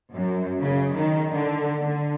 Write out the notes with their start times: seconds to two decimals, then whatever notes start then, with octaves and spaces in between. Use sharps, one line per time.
0.13 F#2
0.60 C#3
0.94 D#3
1.32 D3
1.84 D3